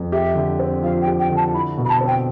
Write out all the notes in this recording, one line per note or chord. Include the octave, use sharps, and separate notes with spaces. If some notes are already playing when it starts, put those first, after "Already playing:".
Already playing: F2
G4 E5
D3
C4
F3 F5
G5
G4
G5
D3
A5
E4 B5
B2
B5
A5
C4
G5